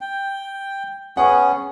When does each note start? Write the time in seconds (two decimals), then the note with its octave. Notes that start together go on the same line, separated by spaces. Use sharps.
0.01 G5
1.17 B3 C#4 G#4 F#5